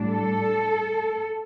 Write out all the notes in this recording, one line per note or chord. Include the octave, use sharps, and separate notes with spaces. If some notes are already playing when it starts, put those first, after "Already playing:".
Already playing: A2 G3 D4
A4